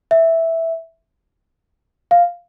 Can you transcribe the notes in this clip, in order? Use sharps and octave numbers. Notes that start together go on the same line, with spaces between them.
E5
F5